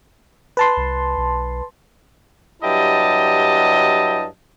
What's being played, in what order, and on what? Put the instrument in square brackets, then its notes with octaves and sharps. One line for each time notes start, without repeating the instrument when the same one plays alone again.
[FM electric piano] B4 A5 C6
[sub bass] C2
B1
[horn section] G2 F#3 E4 G4 D#5 A5